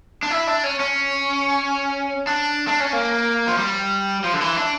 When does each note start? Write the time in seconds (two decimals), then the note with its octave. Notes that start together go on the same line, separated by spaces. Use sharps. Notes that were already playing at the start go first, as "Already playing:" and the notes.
0.23 D4
0.31 E4
0.47 D4
0.63 C#4
0.80 C#4
2.27 D4
2.68 D4
2.80 C#4
2.93 A#3
3.47 F3
3.58 G3
4.24 F3
4.33 D3
4.41 E3
4.57 D4